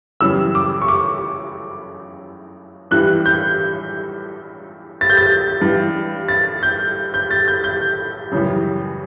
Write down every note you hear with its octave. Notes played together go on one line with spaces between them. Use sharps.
F#2 C#3 E3 G3 E6
D6
C#6
D6
G2 E3 G3 F#6
G6
A6
G6
A6
G2 E3 G3
A6
G6
G6
A6
G6
G6
F#2 C#3 E3 G3